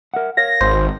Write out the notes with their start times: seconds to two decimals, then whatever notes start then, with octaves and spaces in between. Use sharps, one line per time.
0.14 A#4 E5 F#5
0.37 A#4 C#5 F5 A#6
0.61 G#1 C5